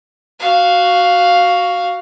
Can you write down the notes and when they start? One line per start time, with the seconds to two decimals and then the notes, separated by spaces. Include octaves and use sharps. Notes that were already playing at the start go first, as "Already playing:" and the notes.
0.40 F#4 F5